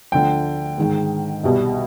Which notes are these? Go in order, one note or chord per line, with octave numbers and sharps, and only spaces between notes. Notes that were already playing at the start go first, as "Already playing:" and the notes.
D2 D3 F3 G5
G#2 D#3 G#3
C2 B2 G3